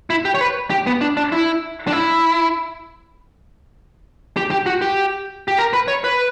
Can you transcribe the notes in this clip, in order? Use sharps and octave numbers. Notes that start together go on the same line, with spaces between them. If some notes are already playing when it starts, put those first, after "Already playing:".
E4
G4
C#5
B4
G4
B3
D4
D4
E4
D4
E4
G4
G4
F#4
G4
G4
A#4
B4
C#5
B4